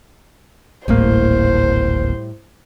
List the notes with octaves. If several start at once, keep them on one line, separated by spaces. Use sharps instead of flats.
D1 G#1 A2 G3 A#3 C5